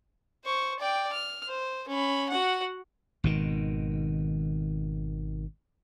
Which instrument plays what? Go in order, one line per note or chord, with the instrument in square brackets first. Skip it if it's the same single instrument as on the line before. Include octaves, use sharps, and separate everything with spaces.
[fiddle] C5 C#6
D5 G5
F6
C5
C#4 B5
F#4 F#5
[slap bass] G#1 B2 D#3